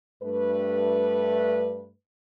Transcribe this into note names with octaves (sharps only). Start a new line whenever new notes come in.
G2 A3 B4